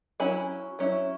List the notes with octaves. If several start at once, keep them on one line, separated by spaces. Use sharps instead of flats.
F#3 C#4 E4 G#5 B5
F#3 C#4 E4